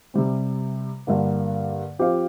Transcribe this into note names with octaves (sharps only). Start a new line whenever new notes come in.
C3 G3 C4
G2 D3 A#3
F3 C4 G4 C5 F5